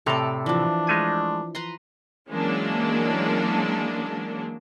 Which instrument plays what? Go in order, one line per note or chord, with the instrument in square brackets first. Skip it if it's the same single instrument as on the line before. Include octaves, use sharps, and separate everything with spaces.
[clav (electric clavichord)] A2 C3 A#5 [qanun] A4 D5
[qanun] E3 F3 [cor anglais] D4
[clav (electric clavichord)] G#3 A3 G#5
[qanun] B4 A#5 C6
[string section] E3 F#3 G#3 A#3 C#4 D4